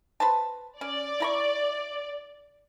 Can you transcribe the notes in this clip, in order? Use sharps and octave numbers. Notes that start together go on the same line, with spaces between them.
B4 C5 A5
C#4 D5
E4 A#5 C#6